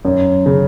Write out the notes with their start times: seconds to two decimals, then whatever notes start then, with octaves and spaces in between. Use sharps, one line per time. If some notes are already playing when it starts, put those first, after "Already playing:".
0.05 F#2
0.46 C#3